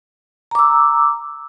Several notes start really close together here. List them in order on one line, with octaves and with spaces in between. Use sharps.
A#5 D6 E6